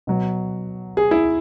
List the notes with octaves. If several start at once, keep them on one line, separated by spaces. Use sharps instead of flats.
B2 F#3
G#4
E4